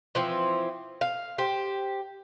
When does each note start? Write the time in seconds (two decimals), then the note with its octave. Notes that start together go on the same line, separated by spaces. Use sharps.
0.15 E3 F3 C4
1.01 F5
1.38 G4 C5